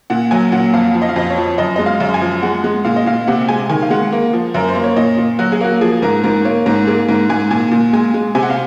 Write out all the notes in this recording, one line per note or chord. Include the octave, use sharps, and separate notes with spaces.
A#2 F#5
F#3 G#5
A#2 F#5
F2 F5
F3
D#5
F5
F2 D#5
C#5
F3
F#2 D#5
G#3 D#5
F5
F#2
G#5
F3
G#3 F#5
G#3
A#2 F5
D#5
A#2 F5
C3 F#5
G#3 G#5
D#3 G#5
F5
G#3 F#5
A#3
F3
F#2 A#4
C5
A#3
C#5
A#2 D#5
A#2
F#3 F#4
G#4
A#3 F#4
F3 G#4
G#2 A#4
G#2 A#4
A#3 C#5
G#2 A#4
A#3 G#4
G#2 A#4
G#2 G#5
A#2 G#5
A#2
G#3 G#5
G#3
C3 G#5
F#5
F5